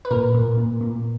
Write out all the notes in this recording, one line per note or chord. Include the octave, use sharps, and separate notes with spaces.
B4
A#2 A#4
A#2
A#2
A#2